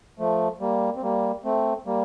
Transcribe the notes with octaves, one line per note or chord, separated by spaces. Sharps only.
F3 A3
G3 A#3
C4
G3 A#3
A3 C4
G3 A#3